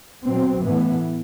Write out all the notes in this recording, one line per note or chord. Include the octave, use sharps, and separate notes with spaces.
B2 F#3 C4
A2 E3 B3